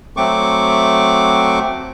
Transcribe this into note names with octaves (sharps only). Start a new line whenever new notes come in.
F#3 A3 C4 C#6 D6